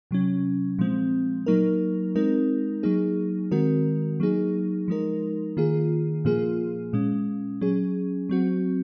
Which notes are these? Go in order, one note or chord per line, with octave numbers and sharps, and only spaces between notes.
C3 F#3 C#4
A#2 F3 G#3 C4
F#3 A#3 D#4 A#4
G#3 C4 D#4 A#4
F#3 A#3 D#4 G#4
D#3 G#3 C4 F#4 A#4
F#3 A#3 D#4 G#4
F3 G#3 D#4 A#4
D#3 A#3 F4 G#4
A#2 F3 A#3 F4 G#4
A#2 G#3 C#4
F#3 C#4 G#4
F#3 C4 F#4